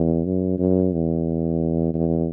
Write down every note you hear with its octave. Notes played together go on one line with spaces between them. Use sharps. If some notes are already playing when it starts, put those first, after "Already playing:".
Already playing: E2
F#2
F#2
E2
E2